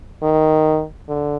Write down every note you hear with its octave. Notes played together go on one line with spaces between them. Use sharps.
D#3
D3